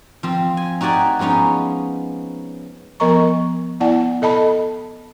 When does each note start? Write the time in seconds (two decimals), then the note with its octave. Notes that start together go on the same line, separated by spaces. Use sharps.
0.23 F3 C4
0.57 G#5
0.81 D#4 F#4 G4 D5 G#5
1.19 F3 G#3 B3 C#4 D#4
3.00 F3 B3 A#4 D#5 A#5 C#6
3.80 B3 E4 D5 F#5 A5
4.22 A4 D#5 A5 B5